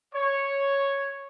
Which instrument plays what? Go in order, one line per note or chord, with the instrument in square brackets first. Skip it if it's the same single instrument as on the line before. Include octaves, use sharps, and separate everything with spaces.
[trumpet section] C#5